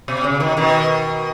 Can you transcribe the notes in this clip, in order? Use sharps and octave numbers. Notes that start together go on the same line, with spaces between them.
B2
C#3
B2 D#3
B2 D#3